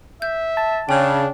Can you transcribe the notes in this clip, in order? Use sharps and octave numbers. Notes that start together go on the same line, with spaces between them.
E5 G6
A5
C#3 D4 C#5 G5